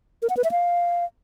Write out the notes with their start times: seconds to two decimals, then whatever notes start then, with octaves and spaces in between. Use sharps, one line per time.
0.22 A#4
0.30 F#5
0.37 B4
0.44 E5
0.51 F5